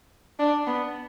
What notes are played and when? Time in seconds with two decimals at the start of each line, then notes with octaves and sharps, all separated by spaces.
0.39 D4
0.67 B3